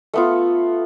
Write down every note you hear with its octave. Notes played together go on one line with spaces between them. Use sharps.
A3 B3 F4